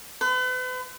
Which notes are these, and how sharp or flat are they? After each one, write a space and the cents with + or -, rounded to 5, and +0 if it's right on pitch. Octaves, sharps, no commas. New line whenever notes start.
B4 +40